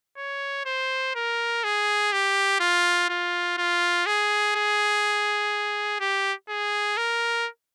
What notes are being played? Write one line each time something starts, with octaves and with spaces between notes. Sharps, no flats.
C#5
C5
A#4
G#4
G4
F4
F4
F4
G#4
G#4
G4
G#4
A#4